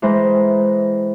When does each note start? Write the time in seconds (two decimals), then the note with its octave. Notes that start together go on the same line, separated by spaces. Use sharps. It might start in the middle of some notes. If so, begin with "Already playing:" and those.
0.02 E3 G#3 C5 G5 A#5